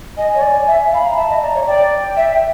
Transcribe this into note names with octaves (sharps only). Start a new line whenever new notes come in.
D#5 G#5
C#5
D5
E5
F5
B5
A#5
E5 A5
D#5
D5 A#5
C#5
D5 G5
E5